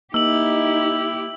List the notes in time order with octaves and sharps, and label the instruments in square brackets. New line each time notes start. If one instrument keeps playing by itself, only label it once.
[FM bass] A#3 [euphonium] D#4 [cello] E4 G4 [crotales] E6 F#7